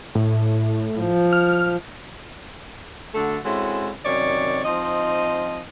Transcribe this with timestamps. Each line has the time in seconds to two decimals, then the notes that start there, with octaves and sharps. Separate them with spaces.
0.15 A2
0.98 F3
1.33 F6
3.15 D3 A3 F#4 A4
3.45 G#3 C4 C#4 E4 F#4 A4
4.05 F#2 C3 D#3 C#5 D5
4.64 F3 C4 D#4 D#5